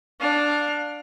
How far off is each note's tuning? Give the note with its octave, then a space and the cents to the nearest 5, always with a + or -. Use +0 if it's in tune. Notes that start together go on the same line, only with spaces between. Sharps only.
D4 +0 F5 +25